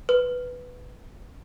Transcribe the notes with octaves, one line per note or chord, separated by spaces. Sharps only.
B4